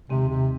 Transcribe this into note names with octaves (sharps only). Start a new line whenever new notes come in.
D#2 C3 D#3 G#3 C4
C3